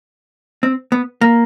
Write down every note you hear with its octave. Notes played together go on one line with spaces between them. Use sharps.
C4
B3
A#3